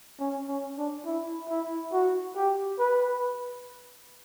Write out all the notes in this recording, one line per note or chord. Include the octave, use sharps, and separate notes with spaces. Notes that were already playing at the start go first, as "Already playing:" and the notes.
C#4
C#4
D4
E4
E4
F#4
G4
B4